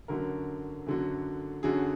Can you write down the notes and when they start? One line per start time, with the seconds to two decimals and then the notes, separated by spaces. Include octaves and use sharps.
0.08 F#2 D3 F#3 A#4
0.86 F#2 D3 F#3
1.63 F#2 D3 F#3 G#4